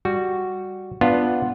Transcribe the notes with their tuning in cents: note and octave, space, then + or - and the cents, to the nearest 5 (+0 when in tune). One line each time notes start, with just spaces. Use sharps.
G3 +0 F#4 +0
B3 +0 D4 +0 F4 +0